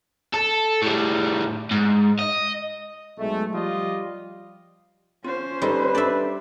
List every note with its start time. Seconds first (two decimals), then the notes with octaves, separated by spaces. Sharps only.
0.34 A4
0.82 A2 G3
1.71 G#2
2.19 D#5
3.19 B1 G#3 A3
3.53 F3 G3 F4 G4 D#5
5.24 C#4 F4 C5
5.62 G3 D#4 A4 B4 D#5
5.95 D4 A4 D5 E5